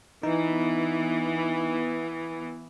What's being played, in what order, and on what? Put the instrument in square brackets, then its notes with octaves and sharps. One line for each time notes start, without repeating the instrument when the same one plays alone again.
[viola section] E3 B3 [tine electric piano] D#4